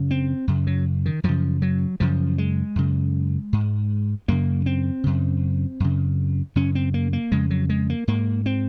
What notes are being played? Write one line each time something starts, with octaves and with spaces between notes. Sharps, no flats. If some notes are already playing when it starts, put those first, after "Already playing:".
Already playing: F#2 C#3
C4
F#2 C#3
F#3
D#3
F#2 C#3 F3
F#3
F#2 C#3 F3
G#3
F#2 C#3
G#2
F#2 C#3 A#3
C4
F#2 C#3
F#2 C#3
F#2 C#3 C#4
C4
A#3
A#3
F2 C#3 G#3
F#3
G#3
A#3
G#2 A#3
C4